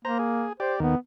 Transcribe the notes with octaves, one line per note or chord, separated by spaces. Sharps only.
A#3 C5 A#5
G#4
G4 C5 D5
D#2 D#3 B3